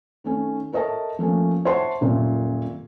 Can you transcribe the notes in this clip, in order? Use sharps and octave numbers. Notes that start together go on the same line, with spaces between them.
D#3 A3 C#4
A4 A#4 C#5 D#5 E5 A5
F3 A3 A#3 C#4
C5 C#5 E5 F#5 A5 C6
D#1 F#2 A#2 E5